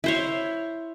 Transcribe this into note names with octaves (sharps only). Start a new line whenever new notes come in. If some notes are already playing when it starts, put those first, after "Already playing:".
E4 C5 C#5